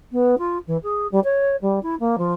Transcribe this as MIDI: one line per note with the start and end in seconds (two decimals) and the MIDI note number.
0.12 0.35 59
0.38 0.58 65
0.67 0.77 52
0.83 1.07 68
1.11 1.19 55
1.24 1.56 73
1.61 1.79 55
1.83 1.95 64
2.00 2.16 58
2.18 2.34 53